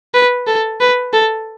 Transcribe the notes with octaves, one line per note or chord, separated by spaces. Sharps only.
B4
A4
B4
A4